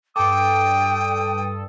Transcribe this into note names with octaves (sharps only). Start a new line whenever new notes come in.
G2 A4 G5 D6 D#6